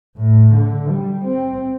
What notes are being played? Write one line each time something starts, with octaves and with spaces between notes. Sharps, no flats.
A2
D3
G3
C4